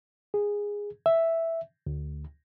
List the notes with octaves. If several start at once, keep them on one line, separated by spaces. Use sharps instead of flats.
G#4
E5
D2